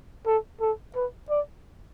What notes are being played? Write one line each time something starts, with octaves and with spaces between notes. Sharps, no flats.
A4
A4
B4
D5